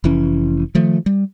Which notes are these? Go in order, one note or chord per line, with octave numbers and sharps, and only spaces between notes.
F1 E3 C#4
D#3 F3 A3
G3